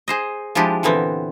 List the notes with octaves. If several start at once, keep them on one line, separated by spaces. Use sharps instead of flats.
G#4 C5 D#5
F3 G#3 D4 E4 G4
A#2 D3 E3 B3 C4